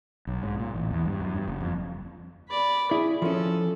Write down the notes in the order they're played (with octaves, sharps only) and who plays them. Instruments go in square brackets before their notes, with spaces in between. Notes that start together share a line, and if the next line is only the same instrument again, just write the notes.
[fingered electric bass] B1
G#2
A#2
A1
E2
G2
F#2
G2
F#1
F2
[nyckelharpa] D5 B5
[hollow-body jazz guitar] E4 [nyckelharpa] G#4
[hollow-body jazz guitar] F3 C#4 [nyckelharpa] A4